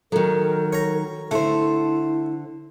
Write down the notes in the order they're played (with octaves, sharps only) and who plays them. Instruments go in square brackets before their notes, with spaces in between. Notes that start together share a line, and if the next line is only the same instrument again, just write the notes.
[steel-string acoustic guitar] D#3 F#3 [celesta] A4 [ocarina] A#4
[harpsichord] C#5 A#5
[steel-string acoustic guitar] D3 C5 [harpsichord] A3 [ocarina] E4